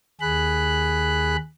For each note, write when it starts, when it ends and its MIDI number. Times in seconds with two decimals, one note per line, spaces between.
0.21 1.36 39
0.21 1.36 68
0.21 1.36 83
0.21 1.36 90